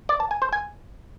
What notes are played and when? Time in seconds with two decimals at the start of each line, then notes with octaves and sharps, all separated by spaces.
0.09 D5
0.20 A5
0.31 G#5
0.42 C5
0.53 G#5